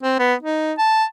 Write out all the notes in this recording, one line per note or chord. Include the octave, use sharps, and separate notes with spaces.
C4
B3
D#4
A5